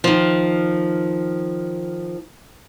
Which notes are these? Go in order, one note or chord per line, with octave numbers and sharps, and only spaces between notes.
D#3 F3